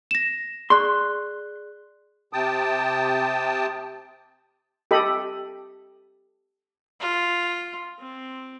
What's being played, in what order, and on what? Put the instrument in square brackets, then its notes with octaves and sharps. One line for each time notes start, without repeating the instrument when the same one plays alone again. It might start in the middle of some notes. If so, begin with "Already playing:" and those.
[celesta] A#6 E7
[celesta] G#4 D5 F#6 [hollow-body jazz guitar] C6
[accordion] C3 G5 A5 D#6
[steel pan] G4 A4 D#5 B5
[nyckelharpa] F4
C4